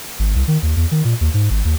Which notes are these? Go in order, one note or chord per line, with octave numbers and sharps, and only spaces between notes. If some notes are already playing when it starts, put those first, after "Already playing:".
G#1
C2
D#3
D#2
E2
D#3
A#2
D#2
G#2
G#1
D#2